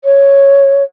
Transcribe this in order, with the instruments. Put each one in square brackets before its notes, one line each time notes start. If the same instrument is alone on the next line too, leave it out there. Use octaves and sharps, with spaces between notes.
[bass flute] C#5